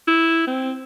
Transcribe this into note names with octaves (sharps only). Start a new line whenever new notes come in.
E4
C4